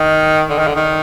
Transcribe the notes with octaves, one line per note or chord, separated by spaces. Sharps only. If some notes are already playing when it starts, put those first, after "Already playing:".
Already playing: D#3
D3
D#3
D3
D#3